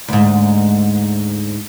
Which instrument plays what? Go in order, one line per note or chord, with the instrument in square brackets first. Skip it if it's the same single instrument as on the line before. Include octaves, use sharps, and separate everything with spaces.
[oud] D2 G#2